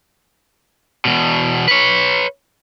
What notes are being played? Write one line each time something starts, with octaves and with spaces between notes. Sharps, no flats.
E2 B2
B4 C#5